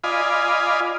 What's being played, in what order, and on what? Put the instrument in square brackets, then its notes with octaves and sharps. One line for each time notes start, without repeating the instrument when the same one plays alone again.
[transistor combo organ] F4 D5 D#5 F5 G#5 B5